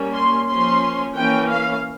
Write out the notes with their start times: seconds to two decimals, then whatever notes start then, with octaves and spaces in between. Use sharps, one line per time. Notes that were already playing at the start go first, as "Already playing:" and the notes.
Already playing: G3 A#3 C#4
0.14 C6
0.48 F3 A#3 C#4 C6
1.16 E3 A#3 C#4 G5
1.50 F5